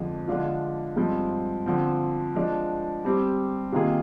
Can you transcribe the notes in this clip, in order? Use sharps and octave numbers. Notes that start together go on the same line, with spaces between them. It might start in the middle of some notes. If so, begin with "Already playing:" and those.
Already playing: F2 D3 F3 G#3
D3 F3 G#3 D4 F4
G2 F3 G#3 C4
D3 F3 C4
F3 G#3 D4
G3 C4 G4
C3 D#3 A#3 F4 G#4